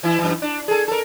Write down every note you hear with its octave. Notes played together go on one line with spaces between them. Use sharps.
E3 E4
F#2 E3
D4
G#4 A4
A4 A#4